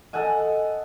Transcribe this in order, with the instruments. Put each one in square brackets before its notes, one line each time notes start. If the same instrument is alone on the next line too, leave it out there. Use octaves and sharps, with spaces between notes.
[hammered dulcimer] A4 D#5 F#5 G#5